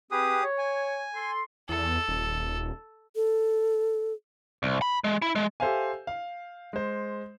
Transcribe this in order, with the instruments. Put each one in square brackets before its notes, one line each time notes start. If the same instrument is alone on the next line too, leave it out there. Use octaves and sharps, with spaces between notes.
[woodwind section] C4 B4 [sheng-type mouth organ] G4 G#4 D#6
[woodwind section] C#5
[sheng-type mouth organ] G#5
[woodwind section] A4 C6
[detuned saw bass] E2 [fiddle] A4
[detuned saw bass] D#1
[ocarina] A4
[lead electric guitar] C2
B5
G#3
E4
G#3
[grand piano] G4 A4 C5 E5 F5 G#5
F5
G#3 C5